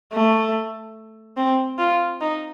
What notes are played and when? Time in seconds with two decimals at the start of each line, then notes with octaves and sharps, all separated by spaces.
0.13 A3
1.37 C4
1.78 F4
2.21 D#4